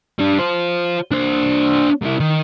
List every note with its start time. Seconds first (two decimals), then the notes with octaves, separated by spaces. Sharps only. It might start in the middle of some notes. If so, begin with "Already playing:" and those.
0.19 G3 D4
0.39 F4 C5
1.11 D4 C5
2.02 C2 E4
2.20 D#3